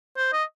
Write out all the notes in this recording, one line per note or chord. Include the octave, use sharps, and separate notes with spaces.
C5
D#5